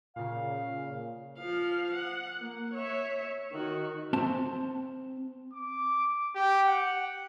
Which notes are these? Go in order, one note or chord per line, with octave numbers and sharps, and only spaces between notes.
A#2 C#3 F5
F3 F5
F#5
A#3
C#5 E5
D#3 F#4
C4 A5
D6
G4
F#5